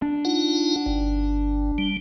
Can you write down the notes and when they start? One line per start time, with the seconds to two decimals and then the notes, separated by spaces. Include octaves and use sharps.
0.02 D4
0.25 D#4 F4 F#5
0.86 G1
1.78 G3